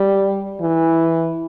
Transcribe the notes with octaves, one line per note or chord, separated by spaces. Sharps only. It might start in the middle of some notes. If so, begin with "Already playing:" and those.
Already playing: G3
E3